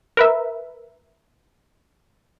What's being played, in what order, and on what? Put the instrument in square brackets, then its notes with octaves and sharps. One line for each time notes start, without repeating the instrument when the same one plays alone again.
[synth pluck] A#4 B4 E5